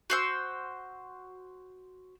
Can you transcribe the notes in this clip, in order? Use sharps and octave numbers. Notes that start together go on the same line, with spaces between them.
F#4 C5 E6